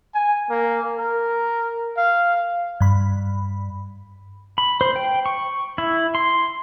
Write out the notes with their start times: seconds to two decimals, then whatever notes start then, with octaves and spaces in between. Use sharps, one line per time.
0.15 G#5
0.50 A#3
0.98 A#4
1.98 F5
2.81 G2 B5
4.58 B5
4.81 C5
4.96 G5
5.26 C#6
5.78 E4
6.15 C6